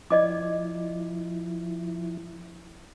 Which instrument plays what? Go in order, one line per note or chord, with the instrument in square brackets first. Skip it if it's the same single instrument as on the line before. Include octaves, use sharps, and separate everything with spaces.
[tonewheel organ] F3 E4 [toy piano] D5 D#5 D6